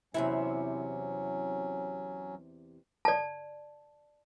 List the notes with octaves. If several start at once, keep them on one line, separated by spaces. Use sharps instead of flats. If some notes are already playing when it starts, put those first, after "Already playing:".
E2 C3 F#3 C#4 E4
D5 A5